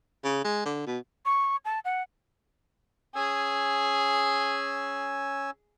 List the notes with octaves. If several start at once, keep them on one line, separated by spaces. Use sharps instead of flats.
C#3
G#3
D3
B2
C#6
A5
F#5
C#4 G#4 G#5 E6